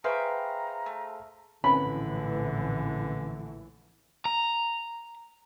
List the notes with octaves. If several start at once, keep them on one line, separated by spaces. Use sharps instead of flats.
G#4 B4 C5 E5 F5 G5 A#5 C#6
A3
A#1 A2 D3 E3 C4 C#4 B4 B5
A#5